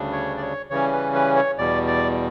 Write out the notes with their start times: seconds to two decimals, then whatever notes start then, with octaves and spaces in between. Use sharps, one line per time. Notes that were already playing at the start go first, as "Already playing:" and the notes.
Already playing: D2 C#3 G3 D4
0.12 C#5
0.37 D5
0.42 C#5
0.70 C#3 E3 G3 C#4 C#5
0.93 B4
1.14 B4
1.36 C#5
1.58 E2 B2 G3 D5
1.87 D5